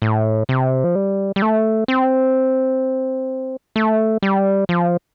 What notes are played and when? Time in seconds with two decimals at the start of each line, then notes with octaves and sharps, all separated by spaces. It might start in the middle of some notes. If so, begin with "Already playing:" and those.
0.02 A2
0.49 C3
0.84 F3
0.95 G3
1.36 G3
1.42 A3
1.88 C4
3.76 A3
4.22 G3
4.69 F3